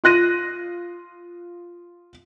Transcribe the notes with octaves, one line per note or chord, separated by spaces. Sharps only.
F4 C6 F#6 A#6 D#7